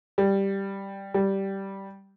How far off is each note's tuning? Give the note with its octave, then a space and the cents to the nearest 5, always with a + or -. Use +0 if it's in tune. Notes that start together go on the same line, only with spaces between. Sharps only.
G3 +0
G3 -10